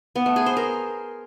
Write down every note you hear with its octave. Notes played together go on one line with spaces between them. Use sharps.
B3
A3
G#4
C5
A#4